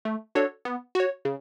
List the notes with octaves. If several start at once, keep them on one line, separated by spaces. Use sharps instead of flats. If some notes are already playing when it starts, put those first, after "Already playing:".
A3
D4 F#4 A4 C#5
B3
F#4 C#5
C#3